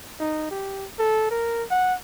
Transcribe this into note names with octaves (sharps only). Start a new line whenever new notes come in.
D#4
G4
A4
A#4
F#5